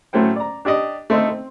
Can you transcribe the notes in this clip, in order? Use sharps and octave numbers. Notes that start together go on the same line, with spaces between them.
A2 F#3 A3 C#4 C5 G5
D5 A#5
D4 G4 D5 D#5
A3 C4 D#4 A4
C4